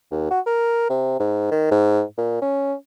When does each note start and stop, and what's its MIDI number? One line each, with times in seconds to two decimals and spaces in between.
0.11 0.29 39
0.31 0.40 66
0.47 0.87 70
0.90 1.17 48
1.20 1.49 44
1.52 1.68 51
1.71 2.02 44
2.18 2.38 46
2.42 2.74 61